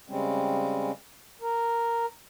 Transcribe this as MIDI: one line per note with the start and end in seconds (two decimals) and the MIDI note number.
0.09 0.91 49
0.09 0.91 55
0.09 0.91 56
0.09 0.91 60
0.09 0.91 61
1.41 2.06 70